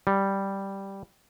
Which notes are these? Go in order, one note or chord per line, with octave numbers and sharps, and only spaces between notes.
G3